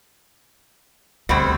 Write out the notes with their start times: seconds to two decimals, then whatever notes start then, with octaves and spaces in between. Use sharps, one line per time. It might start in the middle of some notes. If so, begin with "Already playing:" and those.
1.29 D2 B2 G3 C4